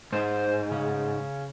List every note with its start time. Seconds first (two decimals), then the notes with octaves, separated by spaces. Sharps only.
0.12 G#2 C5
0.72 C#3